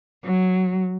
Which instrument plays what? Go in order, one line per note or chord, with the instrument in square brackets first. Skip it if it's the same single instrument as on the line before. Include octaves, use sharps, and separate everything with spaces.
[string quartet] F#3